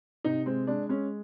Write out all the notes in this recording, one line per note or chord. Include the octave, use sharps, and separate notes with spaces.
C3 D#4
G#3 C4
G#3 D4
G#3 C#4